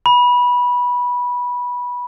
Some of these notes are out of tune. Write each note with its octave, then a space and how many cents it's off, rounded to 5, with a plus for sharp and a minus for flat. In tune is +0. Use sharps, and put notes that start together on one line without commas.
B5 -15